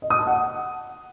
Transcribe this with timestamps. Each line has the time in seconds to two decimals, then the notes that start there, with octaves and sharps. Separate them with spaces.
0.02 D#5
0.10 D#6
0.19 A5
0.27 F#5